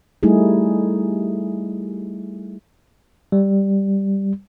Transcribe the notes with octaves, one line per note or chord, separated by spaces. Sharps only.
G3 A3 D#4 E4 G#4
G3